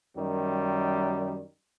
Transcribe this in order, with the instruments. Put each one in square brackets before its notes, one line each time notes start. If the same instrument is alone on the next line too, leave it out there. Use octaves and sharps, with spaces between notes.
[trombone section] F#2 D#3 G3